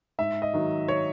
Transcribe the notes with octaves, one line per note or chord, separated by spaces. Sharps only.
G#2 E5
D#5
D#3 F#3
C#5